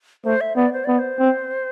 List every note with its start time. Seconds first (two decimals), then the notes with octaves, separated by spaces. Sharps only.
0.25 A3 C5
0.41 E5
0.56 B3 D5
0.73 C5
0.85 B3 D5
0.99 C5
1.20 C4